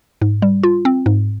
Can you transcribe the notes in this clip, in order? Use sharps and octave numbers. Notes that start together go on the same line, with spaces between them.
G#2
G3
F4
C4
G#2